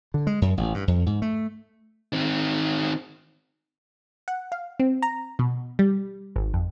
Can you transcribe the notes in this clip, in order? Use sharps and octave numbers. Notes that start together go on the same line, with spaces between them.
D3
G#3
F#2
A1
G2
F2
G#2
A3
D#3 C4
F#5
F5
C4
A#5
B2
G3
G#1
F2